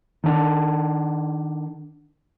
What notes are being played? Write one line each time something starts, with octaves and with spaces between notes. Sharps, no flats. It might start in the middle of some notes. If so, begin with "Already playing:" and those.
D#3 D4